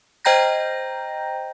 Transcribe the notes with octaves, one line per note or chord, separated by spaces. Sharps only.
C5 D#5 G5 A#5 G6 A#6